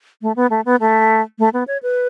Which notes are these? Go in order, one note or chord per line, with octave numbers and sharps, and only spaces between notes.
A3
B3
A3
B3
A3
A3
B3
C#5
B4